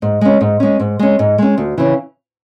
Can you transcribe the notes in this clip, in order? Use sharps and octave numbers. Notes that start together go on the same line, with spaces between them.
G#2
G#3 C#4
G#2
G#3 C#4
G#2
G#3 C#4
G#2
G#3 C#4
D2
C#3 E3